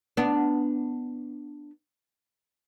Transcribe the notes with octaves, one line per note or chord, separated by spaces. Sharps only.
B3 D4